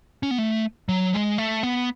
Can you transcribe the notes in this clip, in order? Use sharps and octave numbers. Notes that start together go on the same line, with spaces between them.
C#4
B3
A3
F#3
G#3
A3
B3